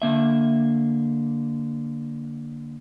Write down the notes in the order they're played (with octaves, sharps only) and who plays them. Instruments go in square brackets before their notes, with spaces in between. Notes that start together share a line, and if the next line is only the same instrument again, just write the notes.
[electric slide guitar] D3 A#3 E5